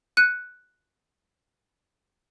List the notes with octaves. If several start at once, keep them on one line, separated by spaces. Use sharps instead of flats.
F#6 C#7 D#7